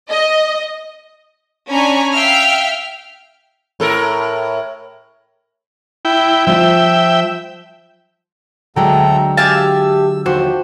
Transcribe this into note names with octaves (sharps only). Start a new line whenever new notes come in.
D#5
C#4 D4 G#5 A#5 B5 C#6
E5 F5 G5 F6
A2 A4 A#4
E4 G5
F3 F4 E5 G5
D2 D3 F#3 G#3 A4 G5 A#5
G4 E5 F5 G#5 A5 F6
E6
D#2 F3 F#4 G4 C5